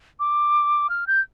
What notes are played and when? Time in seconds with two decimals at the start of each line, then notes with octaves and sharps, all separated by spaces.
0.20 D6
0.90 F6
1.07 G6